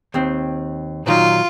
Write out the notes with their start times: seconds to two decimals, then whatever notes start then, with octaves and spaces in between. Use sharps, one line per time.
0.14 D#2 C4
1.06 A#2 D#3 F#3 F4